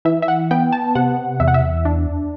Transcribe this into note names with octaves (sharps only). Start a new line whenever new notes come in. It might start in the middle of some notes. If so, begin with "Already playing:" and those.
E3 E5
E5
F#5
B3 G5
A5
C3 F#5
E2 E5
F#5
E5
D4